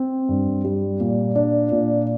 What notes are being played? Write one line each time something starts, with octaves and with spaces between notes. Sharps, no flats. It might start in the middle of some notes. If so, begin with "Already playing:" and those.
Already playing: C4
G2
G3
A#2
D4
A#2